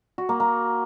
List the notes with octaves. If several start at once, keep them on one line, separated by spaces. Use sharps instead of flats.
F#4
A#3
A#3